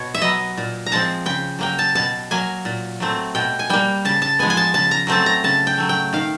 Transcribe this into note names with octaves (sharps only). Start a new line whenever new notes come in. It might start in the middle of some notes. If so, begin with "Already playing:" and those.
Already playing: B2 C#5
E5
F#3 B3 D#5
A#2
A#5
F3 G#3 C4 A5
C#3 G5
F#3 A#3 G5
A5
B2 A5
F#3 A#3 G#5
A#2
F#3 A3 C4
B2 G5
G#5
G3 A#3 G5
C#3 A5
A5
F3 G#3 B3 G#5
G#5
A5
C#3 A5
A#5
F#3 A3 C4 A5
A#5
C#3 A5
G5
F#3 A3
G5
D#3 F5